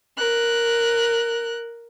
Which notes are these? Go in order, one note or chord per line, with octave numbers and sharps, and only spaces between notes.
A#4 F#6